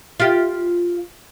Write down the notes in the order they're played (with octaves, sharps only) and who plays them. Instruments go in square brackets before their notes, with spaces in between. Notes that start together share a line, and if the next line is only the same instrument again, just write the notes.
[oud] F4 G4